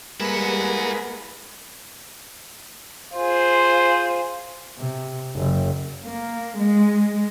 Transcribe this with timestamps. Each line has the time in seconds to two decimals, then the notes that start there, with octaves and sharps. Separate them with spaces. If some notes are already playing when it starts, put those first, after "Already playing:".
0.20 G3 G#3 A#3 E4 B4 F#5
3.14 F4 G#4 C5
4.79 C3
5.36 F#1
6.05 A#3
6.59 G#3